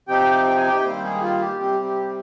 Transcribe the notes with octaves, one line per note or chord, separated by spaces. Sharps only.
C3 F3 C4 D#4 G4 G5
G5
G#5
G4 G5
G2 D#3 G3 A#3 C4 C5
G#3 G#4
F4
G4
C3 G3 C4 G4
G4